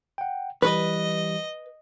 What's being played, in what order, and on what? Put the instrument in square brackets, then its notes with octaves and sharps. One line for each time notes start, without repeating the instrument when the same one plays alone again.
[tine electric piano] F#5 G5
[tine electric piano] E3 G3 G4 [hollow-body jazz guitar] B4 [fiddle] D#5